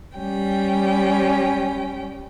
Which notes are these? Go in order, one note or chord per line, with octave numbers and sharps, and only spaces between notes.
G3 C#4 G5